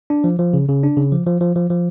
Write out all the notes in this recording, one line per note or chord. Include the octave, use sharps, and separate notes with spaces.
D4
F3
F3
C#3
C#3
D4
C#3
F3
F3
F3
F3
F3